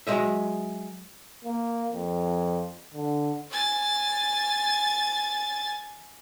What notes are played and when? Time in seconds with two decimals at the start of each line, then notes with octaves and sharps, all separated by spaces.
0.07 F#3 G#3 D#5 E5
1.45 A#3
1.92 F2
2.94 D3
3.50 G#5 A6